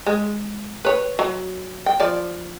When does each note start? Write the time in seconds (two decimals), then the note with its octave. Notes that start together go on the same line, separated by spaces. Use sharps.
0.06 G#3
0.85 B4 C#5
1.19 F#3
1.86 G5
2.00 F3 D5